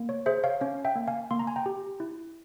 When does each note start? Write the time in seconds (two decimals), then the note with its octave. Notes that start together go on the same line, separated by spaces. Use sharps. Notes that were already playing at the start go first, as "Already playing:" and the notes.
Already playing: A#3
0.09 C#5
0.26 G#4 C5 E5
0.44 C#5 F5
0.61 C#4 C#5 F5
0.85 E5 G5
0.96 A#3
1.08 F5 G#5
1.31 A#3 C6
1.39 A#5
1.47 G#5
1.56 G5 A#5
1.66 G4
2.00 E4